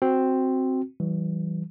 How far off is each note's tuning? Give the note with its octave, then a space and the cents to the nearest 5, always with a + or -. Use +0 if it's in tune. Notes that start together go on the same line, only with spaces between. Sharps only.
C4 +0 F#4 +0
E3 +0 G3 -35